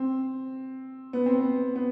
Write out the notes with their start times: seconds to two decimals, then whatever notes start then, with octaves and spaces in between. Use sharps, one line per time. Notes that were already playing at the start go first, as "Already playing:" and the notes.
Already playing: C4
1.13 B3
1.26 C4
1.39 B3
1.75 B3